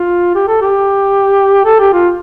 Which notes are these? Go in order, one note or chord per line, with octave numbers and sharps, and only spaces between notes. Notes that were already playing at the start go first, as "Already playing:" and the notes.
Already playing: F4
G4
A4
G4
A4
G4
F4